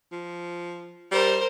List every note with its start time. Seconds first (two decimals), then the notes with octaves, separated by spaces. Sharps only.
0.12 F3
1.12 G3 A#4 C5